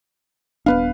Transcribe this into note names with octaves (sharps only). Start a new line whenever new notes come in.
D#1 B3 D4 B4 F5